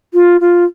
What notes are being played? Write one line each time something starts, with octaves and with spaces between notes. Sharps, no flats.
F4
F4